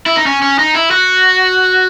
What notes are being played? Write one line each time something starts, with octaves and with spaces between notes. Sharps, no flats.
E4
D#4
C#4
C#4
D#4
E4
F#4